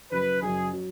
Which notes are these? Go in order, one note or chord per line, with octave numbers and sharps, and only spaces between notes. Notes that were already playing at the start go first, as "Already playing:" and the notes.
F#1 F#2 F#3 B4
F#1 F#2 F#3 G#4
F#3